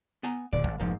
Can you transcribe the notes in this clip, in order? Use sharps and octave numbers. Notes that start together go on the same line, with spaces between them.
B3 G#5 A#5
D1 A#2 D3 D5
G#1
F1 G#2 F3 A#3